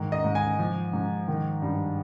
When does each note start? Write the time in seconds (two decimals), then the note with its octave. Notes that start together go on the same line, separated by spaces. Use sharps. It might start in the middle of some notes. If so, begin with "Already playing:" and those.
Already playing: G#2 D#3
0.12 D#5
0.24 G#2
0.35 G#5
0.59 F3
0.93 G#2
1.28 D#3
1.62 G2